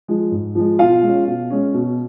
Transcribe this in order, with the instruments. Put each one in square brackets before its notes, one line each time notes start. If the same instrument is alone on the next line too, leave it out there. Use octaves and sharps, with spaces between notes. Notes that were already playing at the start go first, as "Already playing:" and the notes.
[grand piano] F3 G#3
G#2
F3 G#3
B2 F4 F5
G#3 C#4
B2
G#3 C#4
B2